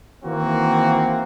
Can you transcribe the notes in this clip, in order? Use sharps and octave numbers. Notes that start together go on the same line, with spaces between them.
D#3 E3 A#3 C4 F#4